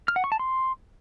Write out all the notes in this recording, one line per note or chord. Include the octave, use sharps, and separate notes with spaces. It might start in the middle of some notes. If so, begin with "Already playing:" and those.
F6
F#5
C#6
A5
C6